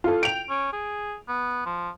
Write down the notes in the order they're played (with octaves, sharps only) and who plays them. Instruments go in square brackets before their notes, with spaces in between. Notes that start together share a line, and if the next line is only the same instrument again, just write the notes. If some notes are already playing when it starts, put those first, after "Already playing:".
[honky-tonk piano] F4 A4
[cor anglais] G5 [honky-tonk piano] D7 F7
[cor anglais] C#4
G#4
B3
F3